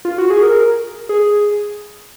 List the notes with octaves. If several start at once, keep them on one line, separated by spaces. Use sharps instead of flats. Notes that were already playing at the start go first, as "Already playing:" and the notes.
F4
F#4
G#4
A#4
G#4